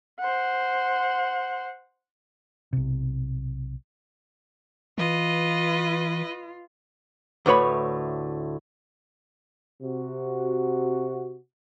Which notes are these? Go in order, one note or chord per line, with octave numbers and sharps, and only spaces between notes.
C5 F#5
B1 C3
E3 F4 B4 D#5
D2 A2 B4 C#5 B5
C3 F#4